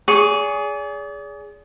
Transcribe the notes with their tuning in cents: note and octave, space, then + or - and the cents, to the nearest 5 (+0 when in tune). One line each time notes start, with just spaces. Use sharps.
G#4 +0 D5 -40 C#6 +0